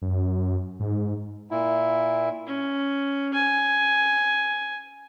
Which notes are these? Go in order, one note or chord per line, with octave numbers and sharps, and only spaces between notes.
F#2
G#2
A#2 E4
C#4
G#5